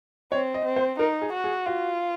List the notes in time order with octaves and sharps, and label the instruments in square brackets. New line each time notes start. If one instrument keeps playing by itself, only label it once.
[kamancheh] C4 [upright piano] C#5
[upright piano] D#5
[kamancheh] C4
[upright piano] C5
[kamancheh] D#4 [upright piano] A#4
[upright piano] G#4
[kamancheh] F#4
[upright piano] G#4
[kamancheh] F4 [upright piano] F#4